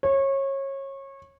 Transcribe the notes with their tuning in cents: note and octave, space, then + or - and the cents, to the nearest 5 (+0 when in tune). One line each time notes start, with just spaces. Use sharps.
C#5 -25